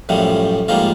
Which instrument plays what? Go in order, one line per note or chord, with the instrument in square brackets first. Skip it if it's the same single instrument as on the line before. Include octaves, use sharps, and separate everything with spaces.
[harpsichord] F#2 A2 F3 G3
G#2 F3 G3 A#3 F4